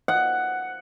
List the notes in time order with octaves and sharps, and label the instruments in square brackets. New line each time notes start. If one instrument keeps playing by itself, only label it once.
[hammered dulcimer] F#5